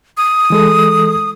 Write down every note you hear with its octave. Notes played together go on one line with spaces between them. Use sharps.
D#6
E3 G#3 A4